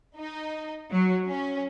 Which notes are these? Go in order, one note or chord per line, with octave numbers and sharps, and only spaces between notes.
D#4
F#3
C#4